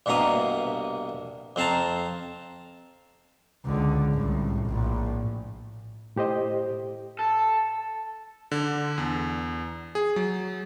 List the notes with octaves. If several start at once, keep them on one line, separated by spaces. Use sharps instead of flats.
C2 G2 B2 A#3 A#5 D#6
F2 C4 F5 A5 A#5
C#2 D3
C2 A2
A#1 A2
A2 G4 C5 D#5
A4
D3
E2
G#4
F#3